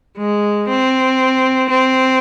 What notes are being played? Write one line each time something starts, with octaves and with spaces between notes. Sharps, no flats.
G#3
C4
C4